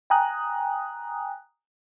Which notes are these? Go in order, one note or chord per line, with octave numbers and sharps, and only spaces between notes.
G5 G#5 A#5 D#6 F#6